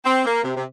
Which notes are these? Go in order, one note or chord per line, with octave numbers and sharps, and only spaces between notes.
C4
A#3
C3
C3